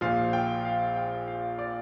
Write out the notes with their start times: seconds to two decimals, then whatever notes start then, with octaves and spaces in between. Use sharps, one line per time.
0.01 A#1 A#2 F3 F5
0.33 G5
0.65 F5
0.96 G5
1.28 F5
1.59 D5